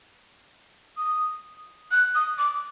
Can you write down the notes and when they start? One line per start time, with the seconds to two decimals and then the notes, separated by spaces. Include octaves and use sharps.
0.97 D#6
1.91 F#6
2.15 D#6
2.38 D6